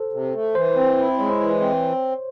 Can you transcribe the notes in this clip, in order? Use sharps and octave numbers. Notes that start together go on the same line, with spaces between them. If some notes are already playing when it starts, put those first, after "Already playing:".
Already playing: A4 C5
C3
A3
E3 C5
C4
E4
G#3 C#5
E3
C4